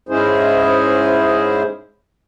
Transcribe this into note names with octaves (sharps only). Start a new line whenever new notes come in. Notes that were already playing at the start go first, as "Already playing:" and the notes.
G#2 G#3 C#4 E4 G#4 C5